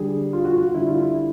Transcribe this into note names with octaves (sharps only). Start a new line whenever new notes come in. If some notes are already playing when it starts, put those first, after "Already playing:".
Already playing: D3 G3 G#4
F4
F#4
F4
D3 G3 E4
F4
E4